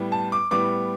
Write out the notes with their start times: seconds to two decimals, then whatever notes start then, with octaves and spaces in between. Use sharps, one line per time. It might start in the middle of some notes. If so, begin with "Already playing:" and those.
Already playing: A2 G3 B3
0.12 A5
0.32 D6
0.51 A2 G3 B3 D6